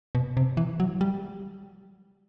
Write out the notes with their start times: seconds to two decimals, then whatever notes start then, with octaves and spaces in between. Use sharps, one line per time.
0.15 B2
0.37 C3
0.57 E3
0.80 F#3
1.01 G3